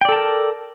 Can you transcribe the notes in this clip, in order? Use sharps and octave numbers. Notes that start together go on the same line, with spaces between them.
A4 A#4 D5 G5 A5